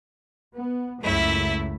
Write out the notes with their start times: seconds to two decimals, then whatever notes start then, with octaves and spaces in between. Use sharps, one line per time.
0.54 B3
1.02 C#2 F#2 A3 E4 E5